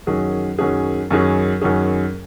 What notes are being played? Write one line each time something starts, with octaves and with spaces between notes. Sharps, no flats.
F#2 D#3 F#3 C#4 G#4
F#2 D#3 F#3 C#4 G#4
F#2 D#3 F#3 C#4 G#4
F#2 D#3 F#3 C#4 G#4